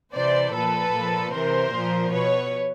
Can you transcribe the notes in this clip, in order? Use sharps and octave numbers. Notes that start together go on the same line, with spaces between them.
C3 E3 C5 D5
A#2 F3 A4 B4
A#2 F3
C3 E3 A#4 C5
A#2 F3
B2 B4 C#5